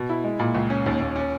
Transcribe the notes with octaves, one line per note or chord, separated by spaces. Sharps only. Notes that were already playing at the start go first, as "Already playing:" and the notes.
Already playing: B2
E4
G#3
A#2
C#2
C#4
D#2
D#2
C#4